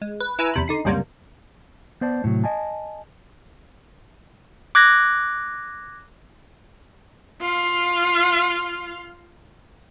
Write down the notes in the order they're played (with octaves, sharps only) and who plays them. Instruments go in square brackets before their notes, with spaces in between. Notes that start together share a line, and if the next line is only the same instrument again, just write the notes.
[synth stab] G#3
B4
E4 B4 G#5 A#5 E6
E2 C3 B5
D3 D#4 C7
C#2 F#2 C3 G3 A#3
[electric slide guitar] B3 C5 D5 A5
A2 C3 F#3
D#5 G#5 A5
[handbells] D6 F#6 G#6 A#6
[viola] F4 F5